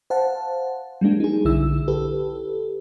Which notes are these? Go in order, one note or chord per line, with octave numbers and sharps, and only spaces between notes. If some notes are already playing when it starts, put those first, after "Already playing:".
C5 F5 F#5 A5
G3 G#3 A#3 D4
D#4 G#4
B1 D3 E4 E6
G4 A4 B4